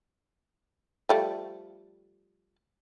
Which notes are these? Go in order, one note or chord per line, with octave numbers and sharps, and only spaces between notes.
F3 G3 A3